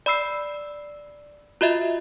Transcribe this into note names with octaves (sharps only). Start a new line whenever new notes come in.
D5 B5 E6 C7
F4 F#4 D#5 E5